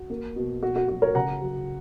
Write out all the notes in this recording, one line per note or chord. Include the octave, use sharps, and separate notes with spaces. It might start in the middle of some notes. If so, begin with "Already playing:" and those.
Already playing: F#4
A#3
B2
B2 F#4
F#4
F#3 F#4
A#4 C#5
C#3 F#5 A#5
F#3